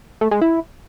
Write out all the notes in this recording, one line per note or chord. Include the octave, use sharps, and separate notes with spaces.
A3
G#3
E4